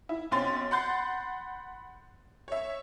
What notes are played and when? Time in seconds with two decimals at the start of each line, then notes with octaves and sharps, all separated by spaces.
0.09 E4
0.31 B1 C4 C#4 C6 A6
0.71 F#5 B5 C6 G6 A6 C7
2.48 C#5 E5